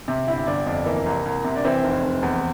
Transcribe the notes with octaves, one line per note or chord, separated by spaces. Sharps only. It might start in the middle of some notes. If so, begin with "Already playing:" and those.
C3
G1 E4
G1 D4
F2 D4
E3 A#3
C2
C2
C3
D4
E3 C4
F1
F1
E2